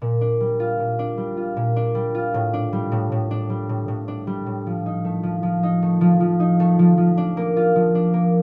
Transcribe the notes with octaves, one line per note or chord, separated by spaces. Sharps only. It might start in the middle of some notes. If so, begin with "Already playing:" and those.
A#2
D4
G3
F4
A#2
D4
G3
F4
A#2
D4
G3
F4
A2
D4
G3
A2
A2
D4
G3
A2
A2
D4
G3
A2
F3
D#4
A3
F3
F3
D#4
A3
F3
F3
D#4
A3
F3
F3
D4
A#3
F4
F3
D4
A#3